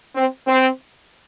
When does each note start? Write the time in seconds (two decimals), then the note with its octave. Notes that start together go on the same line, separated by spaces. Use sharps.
0.15 C4
0.47 C4